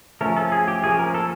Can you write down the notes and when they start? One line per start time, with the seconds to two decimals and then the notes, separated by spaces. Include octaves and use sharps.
0.21 F3 A3 C#4 A#4
0.37 A4
0.52 G#4
0.68 G4
0.84 F3 A#3 C#4 G#4
0.99 A#4
1.14 A4